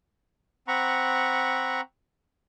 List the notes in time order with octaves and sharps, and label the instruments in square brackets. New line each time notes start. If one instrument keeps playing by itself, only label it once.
[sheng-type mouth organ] C4 F#5 A#5 B5 C#6